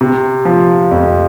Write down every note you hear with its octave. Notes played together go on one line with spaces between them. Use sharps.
C3
F3
F2